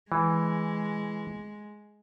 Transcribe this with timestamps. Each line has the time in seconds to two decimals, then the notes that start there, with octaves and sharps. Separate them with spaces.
0.12 E3 G#3